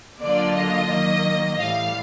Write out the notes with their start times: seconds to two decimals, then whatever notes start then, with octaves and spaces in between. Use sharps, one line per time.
0.20 D3 F#3 A#3 D4 F4 D5
0.55 D#5
0.89 D#3 F#3 A#3
1.59 A2 E3 G3 F5